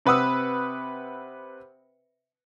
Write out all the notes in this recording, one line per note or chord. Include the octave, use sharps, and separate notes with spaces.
C3 B4 F#5 D#6 E6